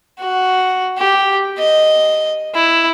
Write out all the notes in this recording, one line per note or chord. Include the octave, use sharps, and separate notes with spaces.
F#4
G4
D#5
E4